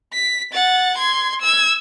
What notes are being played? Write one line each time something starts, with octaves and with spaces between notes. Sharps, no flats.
B6
F#5 A6
C6 G#6
E6 G#6